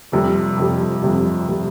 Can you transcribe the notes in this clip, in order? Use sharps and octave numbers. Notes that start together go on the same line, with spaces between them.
F2 C3 G3
F2 C3 G3
F2 C3 G3
C3 G3